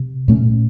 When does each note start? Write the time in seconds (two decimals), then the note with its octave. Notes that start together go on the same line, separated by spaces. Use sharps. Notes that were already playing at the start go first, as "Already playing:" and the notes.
Already playing: C3
0.28 A#2 A3 C#4